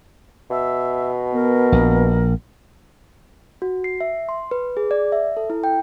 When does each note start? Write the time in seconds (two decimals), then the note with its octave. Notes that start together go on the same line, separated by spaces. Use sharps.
0.50 B2 E5
1.34 B3 A#4
1.72 A#1
3.62 F#4
3.84 C7
4.01 E5
4.29 C6
4.51 B4
4.77 G#4
4.91 D5
5.12 E5
5.37 A4
5.50 E4
5.64 G5